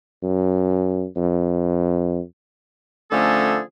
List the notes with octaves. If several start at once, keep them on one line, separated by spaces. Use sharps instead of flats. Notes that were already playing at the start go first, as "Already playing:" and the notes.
F#2
F2
D3 F3 A3 C#4 G#4 A4